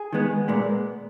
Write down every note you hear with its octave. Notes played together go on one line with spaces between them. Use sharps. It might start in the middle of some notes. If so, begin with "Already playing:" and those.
Already playing: G#4
D#3 G#3 B3
A#2 G#3 B3